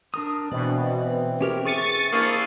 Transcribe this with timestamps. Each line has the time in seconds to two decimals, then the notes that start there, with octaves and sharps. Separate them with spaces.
0.14 D4 A#4 D#6
0.52 B2 E3 C4 D5
1.41 C#4 G4 A#4
1.65 G#4 E5 C#6 A6 D#7
2.13 A#3 D4 E4 G#4 D#6 E6